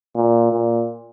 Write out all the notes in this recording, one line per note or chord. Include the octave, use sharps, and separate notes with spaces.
A#2
A#2